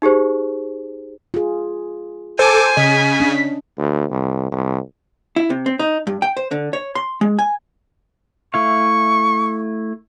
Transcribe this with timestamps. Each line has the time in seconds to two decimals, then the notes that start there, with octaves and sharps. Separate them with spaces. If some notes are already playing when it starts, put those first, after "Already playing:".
0.02 D#4 G4 G#4 C5
1.34 F4 G#4
2.39 A4 C5 G#5 D6
2.77 C#3 D#5 B6
3.20 C#4 D4
3.78 D2
4.10 C2
4.52 C2
5.36 E4
5.50 C3
5.66 C4
5.79 D#4
6.07 G2
6.22 G5
6.37 C5
6.51 D3
6.73 C#5
6.95 C6
7.21 G#3
7.39 G#5
8.54 A3 E4 F5 C#6